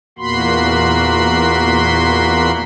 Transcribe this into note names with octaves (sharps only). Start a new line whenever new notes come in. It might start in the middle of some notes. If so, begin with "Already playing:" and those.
E2 A#2 A#3 F#4 B5 C6